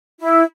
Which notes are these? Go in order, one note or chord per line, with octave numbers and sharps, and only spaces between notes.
E4